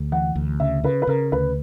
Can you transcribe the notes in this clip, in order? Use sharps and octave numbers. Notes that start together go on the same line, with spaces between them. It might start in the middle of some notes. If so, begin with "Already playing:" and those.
Already playing: D2
E3 F#5
D2
C#3 E5
C#3 B4
B4
C#3 A#4
D2 B4